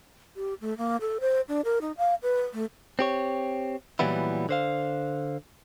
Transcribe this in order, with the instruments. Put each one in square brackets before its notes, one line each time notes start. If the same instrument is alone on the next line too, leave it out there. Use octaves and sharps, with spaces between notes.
[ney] G4
A3
A#3
A4
C5
D4
A#4
D#4
F5
B4
A3
[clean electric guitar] C4 G4 C#5
A#2 E3 F#3 G3 B3 E4
D3 C5 F5